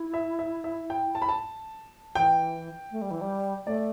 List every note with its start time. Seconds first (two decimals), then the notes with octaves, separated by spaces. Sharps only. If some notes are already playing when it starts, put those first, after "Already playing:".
Already playing: E4
0.14 E5
0.39 E5
0.64 E5
0.90 G5
1.15 A5
1.22 B5
1.29 A5
2.15 E3 G5
2.92 A3
3.02 G3
3.11 E3
3.21 G3
3.66 A3 D5